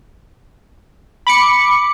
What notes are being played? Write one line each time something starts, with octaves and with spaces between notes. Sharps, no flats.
B5 D6 C#7